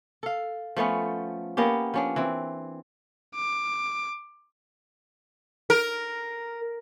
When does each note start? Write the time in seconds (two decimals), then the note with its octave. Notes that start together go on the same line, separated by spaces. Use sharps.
0.23 A4 F5
0.77 F3 A3 B3 C#4
1.57 A#3 B3 C#4 G4
1.94 F3 C#4 D4
2.16 E3 C4
3.35 D6
5.70 A#4